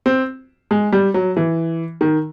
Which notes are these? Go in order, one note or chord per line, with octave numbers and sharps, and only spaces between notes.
C4
G#3
G3
F#3
E3
D#3